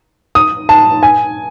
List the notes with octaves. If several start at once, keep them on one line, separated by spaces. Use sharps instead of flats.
D#6
A5
G#5